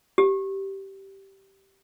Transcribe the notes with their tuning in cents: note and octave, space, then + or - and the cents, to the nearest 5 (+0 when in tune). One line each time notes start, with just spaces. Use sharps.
G4 -15